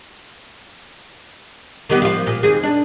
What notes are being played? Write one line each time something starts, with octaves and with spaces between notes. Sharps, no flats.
D#3 G3 B3
F3 F4
A#2
D#2 C4 G#4
D4